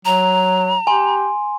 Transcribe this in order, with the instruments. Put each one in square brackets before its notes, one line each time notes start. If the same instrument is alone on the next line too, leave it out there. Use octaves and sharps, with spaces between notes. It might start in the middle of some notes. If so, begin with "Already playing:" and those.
[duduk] F#3 [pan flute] A#5
[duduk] G4 [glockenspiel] G#5 C6